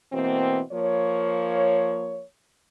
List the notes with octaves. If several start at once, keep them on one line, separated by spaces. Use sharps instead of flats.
B2 E3 A#3 C4
F3 A#3 C#5